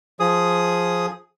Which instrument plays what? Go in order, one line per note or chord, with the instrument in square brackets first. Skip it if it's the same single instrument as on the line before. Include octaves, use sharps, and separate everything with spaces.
[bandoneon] F3 G#4 D#6